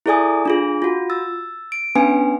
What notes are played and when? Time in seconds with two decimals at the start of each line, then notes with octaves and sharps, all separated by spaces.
0.06 E4 G#4 A4 D5 G#5 D#6
0.45 D4 F4 G#4
0.82 F4 F#4
1.10 E6 A6
1.72 D7
1.95 B3 C#4 D4 B4 G#5